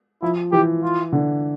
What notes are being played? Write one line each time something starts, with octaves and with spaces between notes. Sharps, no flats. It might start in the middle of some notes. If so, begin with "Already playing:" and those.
F3 E4
E3 G4
F4
D3